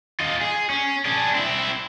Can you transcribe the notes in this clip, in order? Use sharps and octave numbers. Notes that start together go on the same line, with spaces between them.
F4 D#5
G#4
C#4
D4 G#4
C4 E4